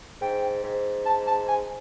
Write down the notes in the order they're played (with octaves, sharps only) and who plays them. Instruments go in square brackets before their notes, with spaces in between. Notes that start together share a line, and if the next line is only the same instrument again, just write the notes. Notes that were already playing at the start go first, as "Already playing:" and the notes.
[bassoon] G#2 [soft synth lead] G5
[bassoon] G#2
[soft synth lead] A5
A5
G#5